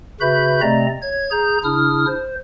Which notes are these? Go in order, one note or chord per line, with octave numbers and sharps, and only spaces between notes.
C#3 F#4 B4 E5 B5 G6
C3 A3 C4 D5 D#5 A#5
C#5 G#6
G#4 A#5 G6
C#3 D4 E4 D#6 F6
C5